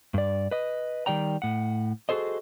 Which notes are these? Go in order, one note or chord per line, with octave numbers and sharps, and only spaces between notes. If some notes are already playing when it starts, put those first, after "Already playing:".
G2 D5
B4 D#5
D#3 G3 D5 G5 A#5
A2 F#5
F#4 G#4 A4 C5 D#5